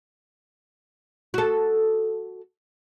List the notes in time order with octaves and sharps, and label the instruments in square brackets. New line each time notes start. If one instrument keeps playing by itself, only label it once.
[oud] F#4 A4